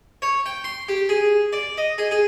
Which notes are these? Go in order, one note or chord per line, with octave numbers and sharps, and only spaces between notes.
C#5
G5
C6
G4
G#4
D5
D#5
G#4
G#4